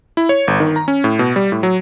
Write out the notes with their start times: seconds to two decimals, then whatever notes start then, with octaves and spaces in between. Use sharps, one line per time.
0.17 E4
0.29 C#5
0.47 G1
0.60 D#3
0.76 A#5
0.88 C#4
1.04 A2
1.19 B2
1.36 G3
1.52 A2
1.63 F#3